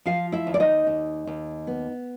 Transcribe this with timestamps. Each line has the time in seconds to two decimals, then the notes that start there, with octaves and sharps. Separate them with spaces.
0.06 F3 F4 F5
0.32 E4 E5
0.47 D#2
0.54 D5
0.60 D#4 D#5
0.87 D#2
1.27 D#2
1.67 B3